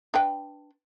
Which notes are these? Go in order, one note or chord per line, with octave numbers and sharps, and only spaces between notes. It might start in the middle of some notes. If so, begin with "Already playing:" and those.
D4 B4 G5